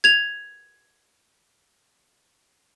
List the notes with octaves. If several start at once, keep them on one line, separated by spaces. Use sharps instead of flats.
G#6 F7